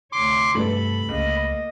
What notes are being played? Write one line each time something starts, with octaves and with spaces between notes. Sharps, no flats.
D2 C#5 C6 D6
G2 C3 A3 A4 B4 B5
C#2 A#3 D#5